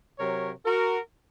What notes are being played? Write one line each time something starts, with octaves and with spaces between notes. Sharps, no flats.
C3 F#3 A#4 C#5
F#4 A#4